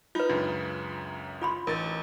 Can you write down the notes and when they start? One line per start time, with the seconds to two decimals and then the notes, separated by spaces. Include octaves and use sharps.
0.15 D#4 F4 B4
0.29 C#2 F#2 C#3 D4
1.42 F4 B5 C6
1.67 A1 D#4 A#4 A6